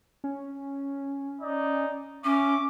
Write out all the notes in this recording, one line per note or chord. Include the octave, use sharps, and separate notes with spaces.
C#4
D#4 D5
C#4 E5 C#6 D6